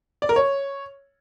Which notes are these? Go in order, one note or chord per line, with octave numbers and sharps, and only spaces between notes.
D5
A#4
C#5